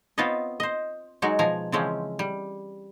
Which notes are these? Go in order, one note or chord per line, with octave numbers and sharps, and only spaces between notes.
B3 C4 F4 B4 C#5 D#5
C5 D#5
F#3 G#3 D#4 F#4
B2 F3 G#5 A#5
C#3 E3 F3 G#3 C4 C#4
G3